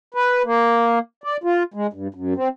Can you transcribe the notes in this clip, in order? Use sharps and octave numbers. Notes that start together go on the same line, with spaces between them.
B4
A#3
D5
F4
G#3
G2
F#2
C4